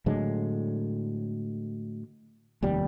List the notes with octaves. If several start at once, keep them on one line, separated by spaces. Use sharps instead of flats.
A2 D3 F#3 G#3
F1 D#2 G3